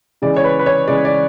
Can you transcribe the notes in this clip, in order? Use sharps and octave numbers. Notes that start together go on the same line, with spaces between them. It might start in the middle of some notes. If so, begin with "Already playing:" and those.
C#3 E3 G#3 D5
C#5
B4
B4
C#5
C#3 E3 G#3 D5
D5